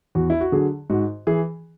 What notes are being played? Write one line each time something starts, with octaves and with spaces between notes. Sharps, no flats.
E2 F#4
E4
F#4
D3 F#3 G#4
G#2 F#4
E3 G#4